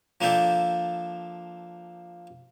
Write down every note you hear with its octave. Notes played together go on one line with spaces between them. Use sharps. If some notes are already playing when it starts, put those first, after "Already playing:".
F3 A#3 D4 A4 E5 G5